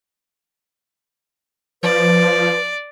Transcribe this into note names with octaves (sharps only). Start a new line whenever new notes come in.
F3 B4 D5